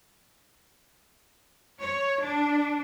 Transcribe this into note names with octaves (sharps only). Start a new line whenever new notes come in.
C#5
D4